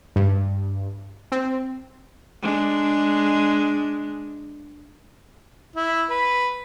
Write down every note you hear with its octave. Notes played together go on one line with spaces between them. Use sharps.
G2
C4
G#3 D4
E4
B4